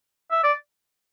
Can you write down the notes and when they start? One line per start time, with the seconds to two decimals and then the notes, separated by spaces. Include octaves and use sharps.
0.31 E5
0.43 D5